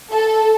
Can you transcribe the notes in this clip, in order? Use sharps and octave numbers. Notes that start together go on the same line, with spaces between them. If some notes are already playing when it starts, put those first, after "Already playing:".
A4